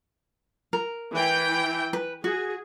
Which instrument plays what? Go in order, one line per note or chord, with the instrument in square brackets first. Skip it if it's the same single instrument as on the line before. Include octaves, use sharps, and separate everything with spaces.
[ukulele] A#4
[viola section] E3 G5
[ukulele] B4
[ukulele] F#4 [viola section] G#4